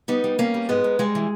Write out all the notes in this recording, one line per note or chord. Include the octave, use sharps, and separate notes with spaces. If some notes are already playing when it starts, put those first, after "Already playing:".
G3 B3 D#4
G3
G3 A#3 C#4
G3
G#2 G#3 B3
G#2
G3 G#3
E3